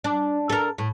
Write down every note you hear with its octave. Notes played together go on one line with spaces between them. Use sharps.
D4
A4 A#4
A2